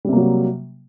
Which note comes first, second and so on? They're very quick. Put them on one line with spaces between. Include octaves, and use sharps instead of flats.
G3 C3 A#3 F#3